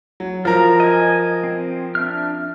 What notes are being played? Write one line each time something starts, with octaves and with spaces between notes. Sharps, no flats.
F#3
F3 F4 A#4 A#5
D#5 G#5
C4
D4 E5 F6